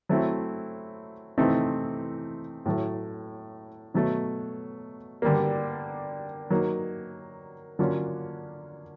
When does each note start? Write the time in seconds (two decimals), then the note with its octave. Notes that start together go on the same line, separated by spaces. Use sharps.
0.09 F#3 A3 C4 E4
1.38 C3 E3 A3 C4 D#4
2.66 A2 F#3 A3
3.94 B2 F#3 A3
5.22 D3 G3 A#3
6.50 F#3 A#3 D#4
7.79 D3 F#3 A#3 C#4 F4